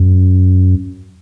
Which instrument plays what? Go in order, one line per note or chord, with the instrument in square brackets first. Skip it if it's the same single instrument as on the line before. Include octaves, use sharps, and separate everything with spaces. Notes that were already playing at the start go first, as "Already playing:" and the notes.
Already playing: [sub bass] F#2